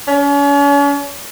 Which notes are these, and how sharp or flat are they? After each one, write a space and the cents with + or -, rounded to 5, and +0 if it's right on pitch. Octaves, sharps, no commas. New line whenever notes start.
C#4 +40